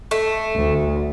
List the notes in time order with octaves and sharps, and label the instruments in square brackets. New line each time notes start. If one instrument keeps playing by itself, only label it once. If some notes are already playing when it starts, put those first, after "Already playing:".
[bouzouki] A3
[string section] D2